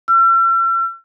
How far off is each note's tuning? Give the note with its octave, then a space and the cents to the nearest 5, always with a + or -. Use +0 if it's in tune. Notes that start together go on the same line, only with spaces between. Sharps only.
E6 +45